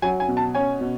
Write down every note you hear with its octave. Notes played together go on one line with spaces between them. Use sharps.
F#3 G#5
G#5
B2
A5
C#4 G#5
B2